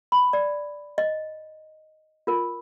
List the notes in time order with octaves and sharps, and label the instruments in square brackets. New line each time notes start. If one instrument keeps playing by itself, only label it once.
[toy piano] B5
D5
D#5
F4 A#4